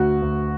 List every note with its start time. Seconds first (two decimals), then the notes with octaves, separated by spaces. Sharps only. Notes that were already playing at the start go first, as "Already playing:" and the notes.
Already playing: D2 F#4
0.22 D2